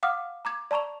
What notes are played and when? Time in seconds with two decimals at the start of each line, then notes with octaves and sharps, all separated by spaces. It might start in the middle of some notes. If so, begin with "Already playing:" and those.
0.03 F5 F#5 D6 D#6 F6
0.45 A#5 D6 G#6
0.71 D5 A5 A#5 C#6 F7